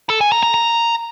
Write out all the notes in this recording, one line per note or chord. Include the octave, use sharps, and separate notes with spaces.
A4
G#5
A#5
A#5
A#5